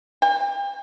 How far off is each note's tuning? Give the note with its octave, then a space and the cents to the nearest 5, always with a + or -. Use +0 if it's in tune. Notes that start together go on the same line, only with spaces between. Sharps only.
G5 +40